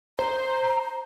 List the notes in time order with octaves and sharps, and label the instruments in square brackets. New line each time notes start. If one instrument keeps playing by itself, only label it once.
[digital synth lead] C5 [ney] A#5